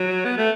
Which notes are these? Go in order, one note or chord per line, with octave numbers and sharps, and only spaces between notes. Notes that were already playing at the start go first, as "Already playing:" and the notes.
Already playing: F#3
B3
A3